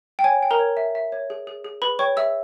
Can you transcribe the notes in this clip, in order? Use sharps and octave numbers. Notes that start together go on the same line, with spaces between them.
G5
C#5 G#5
G5
A#4 A#5
C#5
E5
E5
C#5
G#4
G#4
G#4
G#4 B4 B5
C#5 G5 C#6
G#4 E5 E6